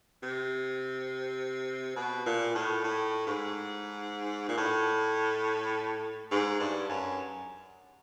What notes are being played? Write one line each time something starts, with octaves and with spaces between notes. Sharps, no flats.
C3
B2
A#2
A2
A2
G#2
A#2
A2
G#2
G2
F#2